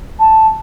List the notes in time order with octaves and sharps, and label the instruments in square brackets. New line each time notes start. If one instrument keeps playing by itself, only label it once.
[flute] A5